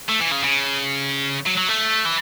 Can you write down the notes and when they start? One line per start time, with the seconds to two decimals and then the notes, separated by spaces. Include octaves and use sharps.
0.09 A3
0.20 E3
0.32 C#3
0.44 C#3
1.46 F#3
1.58 F#3
1.69 A3
2.05 E3